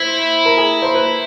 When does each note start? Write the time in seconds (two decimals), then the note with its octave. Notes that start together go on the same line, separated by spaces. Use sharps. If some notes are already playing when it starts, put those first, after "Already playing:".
Already playing: E4 C5
0.45 A#4
0.57 G#4
0.82 C5
0.94 B4